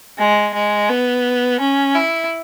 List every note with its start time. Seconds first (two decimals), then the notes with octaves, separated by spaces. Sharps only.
0.18 G#3
0.54 G#3
0.89 B3
1.60 C#4
1.95 E4